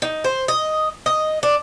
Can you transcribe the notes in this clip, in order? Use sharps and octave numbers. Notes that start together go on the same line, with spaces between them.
D#4
C5
D#5
D#5
D4